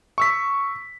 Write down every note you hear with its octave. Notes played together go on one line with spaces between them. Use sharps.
C#6 E6 B6